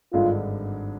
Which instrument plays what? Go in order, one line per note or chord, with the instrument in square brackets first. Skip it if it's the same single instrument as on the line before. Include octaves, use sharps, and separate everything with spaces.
[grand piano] G#1 G2 D3 G#3 D4 [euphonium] F4